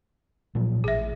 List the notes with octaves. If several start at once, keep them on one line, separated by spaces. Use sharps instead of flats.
A#2 F3 F#3
A1 G#4 E5